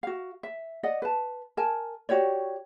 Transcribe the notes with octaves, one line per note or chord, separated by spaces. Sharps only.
F#4 F5
E5
D5 D#5 F#5
B4 A5
A#4 G#5 A5
F#4 G4 C#5 D5